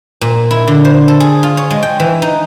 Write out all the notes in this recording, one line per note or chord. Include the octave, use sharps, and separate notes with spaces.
A#2
E4
D3
C5
A4
G#4
F4
C#5
G#3
G5
E3
D#4